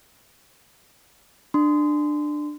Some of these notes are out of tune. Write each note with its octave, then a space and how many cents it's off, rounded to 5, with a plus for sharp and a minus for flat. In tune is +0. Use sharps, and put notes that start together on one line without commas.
D4 +20 C6 -25